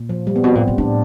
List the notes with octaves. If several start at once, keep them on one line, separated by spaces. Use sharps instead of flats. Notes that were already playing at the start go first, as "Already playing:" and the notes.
Already playing: A#2
F3
G3
B3
B2 C4
A#2
A#2
A2 D4